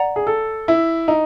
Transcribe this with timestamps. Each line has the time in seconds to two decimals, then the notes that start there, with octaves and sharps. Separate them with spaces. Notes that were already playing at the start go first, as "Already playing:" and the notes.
Already playing: D5 F#5 A#5
0.16 G#4
0.27 A4
0.68 E4
1.08 D#4